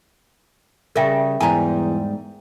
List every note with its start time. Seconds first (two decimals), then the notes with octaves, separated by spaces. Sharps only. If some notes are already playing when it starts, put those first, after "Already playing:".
0.96 C#3 G3 A#4 E5 G5
1.40 E2 G#2 G3 G#5 A#5